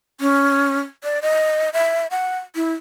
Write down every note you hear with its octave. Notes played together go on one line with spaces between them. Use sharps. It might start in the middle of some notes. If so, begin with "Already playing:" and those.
C#4
D5
D#5
E5
F#5
E4